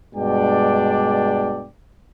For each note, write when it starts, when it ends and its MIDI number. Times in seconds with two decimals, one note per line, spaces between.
0.16 1.67 43
0.16 1.67 47
0.16 1.67 56
0.16 1.67 62
0.16 1.67 74
0.16 1.67 79